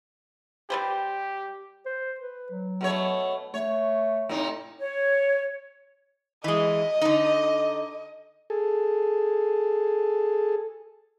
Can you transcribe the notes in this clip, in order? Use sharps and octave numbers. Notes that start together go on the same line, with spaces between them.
G3 G4 B4 C5
C5
B4
F#3
B2 A3 C#5
A3 C#5
A2 C3 D#4
C#5
E3 G#3 D#5
D3 D#4
G#4 A4